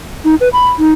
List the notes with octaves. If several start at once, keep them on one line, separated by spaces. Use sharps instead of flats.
D#4
B4
B5
D#4